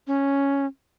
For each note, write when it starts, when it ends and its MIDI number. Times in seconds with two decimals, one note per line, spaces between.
0.07 0.66 61